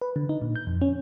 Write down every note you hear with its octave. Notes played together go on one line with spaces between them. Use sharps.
B4
D3
D#4
A#2
G6
F2
C#4